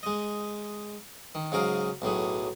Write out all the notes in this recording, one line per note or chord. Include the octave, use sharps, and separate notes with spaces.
G#3 D#5
D#3
G#2 C#3 F#3 G#4 A#4 F5
B1 A2 F#3 G#4